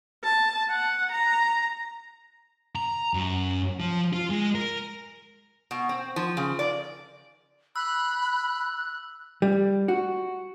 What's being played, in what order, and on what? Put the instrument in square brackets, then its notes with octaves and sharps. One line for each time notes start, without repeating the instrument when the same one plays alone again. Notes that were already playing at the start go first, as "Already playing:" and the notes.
[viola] A5
F#5
A#5
[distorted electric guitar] A#5
F#2
F3
F4
G#3
A#4
[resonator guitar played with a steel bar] B2
C4
F3
C#3
D5
[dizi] B5 [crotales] E6 [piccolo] F#6
[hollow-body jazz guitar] G3
F#4